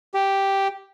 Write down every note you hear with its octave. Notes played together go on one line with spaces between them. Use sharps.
G4